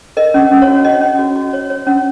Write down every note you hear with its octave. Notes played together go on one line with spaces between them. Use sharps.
A#4 D#5
C#4
C#4
C#5 F5
F#4
C#4 D#5
C#4
F#4
F#4
C#5
C#5
C#4